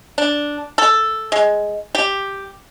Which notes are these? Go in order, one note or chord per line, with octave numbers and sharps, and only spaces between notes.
D4
A4
G#3
G4